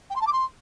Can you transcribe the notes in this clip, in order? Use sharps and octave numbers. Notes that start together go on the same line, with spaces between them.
G5
C6
A5
D6
C6